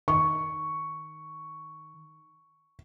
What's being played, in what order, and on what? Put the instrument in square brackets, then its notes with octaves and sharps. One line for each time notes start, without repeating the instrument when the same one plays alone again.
[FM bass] D#3 [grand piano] C#6